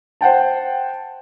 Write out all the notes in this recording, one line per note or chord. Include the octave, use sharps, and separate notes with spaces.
C5 F#5 G5 A5